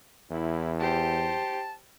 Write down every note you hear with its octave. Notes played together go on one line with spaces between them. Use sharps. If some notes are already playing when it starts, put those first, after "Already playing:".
E2 E4
G4 C5 A5